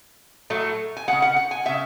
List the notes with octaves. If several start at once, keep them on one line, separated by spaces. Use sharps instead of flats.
A2 F#3 A3
G#5
C#3 G#3 F#5
F#5
F#5
G#5
C#3 G#3 E5